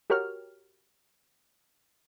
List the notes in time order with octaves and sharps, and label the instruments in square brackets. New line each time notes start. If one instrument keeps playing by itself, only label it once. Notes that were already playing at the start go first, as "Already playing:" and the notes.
[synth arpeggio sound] F#4 G4 A#4 C#5 F6